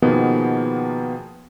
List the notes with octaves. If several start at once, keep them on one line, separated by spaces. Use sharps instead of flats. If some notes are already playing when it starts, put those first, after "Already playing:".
B2 D#3 F3 A#3 B3 G#4